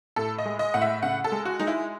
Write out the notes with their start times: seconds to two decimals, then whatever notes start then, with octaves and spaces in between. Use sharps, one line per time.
0.16 A2 A4
0.38 D#5
0.45 G#3
0.59 D#5
0.74 A2 F#5
0.82 E5
1.03 C#3 F#5
1.24 A4
1.32 G#3
1.45 F#4
1.60 G#3 D#4
1.67 E4